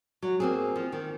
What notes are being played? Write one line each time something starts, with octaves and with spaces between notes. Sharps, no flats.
F#3
A#3 C4 G#4
F3
D#3